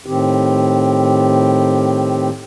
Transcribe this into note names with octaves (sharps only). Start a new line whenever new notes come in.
A2 D#3 C4 G4